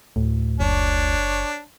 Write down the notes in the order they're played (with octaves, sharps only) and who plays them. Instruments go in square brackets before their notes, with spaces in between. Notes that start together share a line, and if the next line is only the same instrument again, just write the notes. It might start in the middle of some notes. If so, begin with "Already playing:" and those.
[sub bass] D2 [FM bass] A2
[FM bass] F#1 [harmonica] D4 C#5